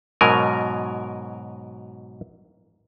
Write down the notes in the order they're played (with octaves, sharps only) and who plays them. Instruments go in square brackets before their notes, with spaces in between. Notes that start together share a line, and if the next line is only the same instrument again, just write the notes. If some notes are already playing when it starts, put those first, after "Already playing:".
[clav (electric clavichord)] G#2 B2 F#3 A#4 G#5